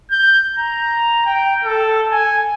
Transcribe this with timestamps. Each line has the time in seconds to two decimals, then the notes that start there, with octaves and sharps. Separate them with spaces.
0.11 G6
0.55 A#5
1.26 G5
1.64 A4
2.12 G#5